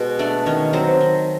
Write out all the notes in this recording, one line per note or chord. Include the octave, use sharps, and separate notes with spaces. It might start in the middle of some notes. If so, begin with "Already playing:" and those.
Already playing: B2 G#3 B3
A3 D4 D5
D#3 C#4 C#5
F#3 C4 C5
D#3